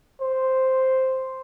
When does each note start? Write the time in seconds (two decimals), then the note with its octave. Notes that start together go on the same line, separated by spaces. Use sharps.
0.21 C5